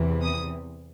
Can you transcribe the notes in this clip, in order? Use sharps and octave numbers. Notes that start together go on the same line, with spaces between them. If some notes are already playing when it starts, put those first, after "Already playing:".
Already playing: E2 C3 E3
D#6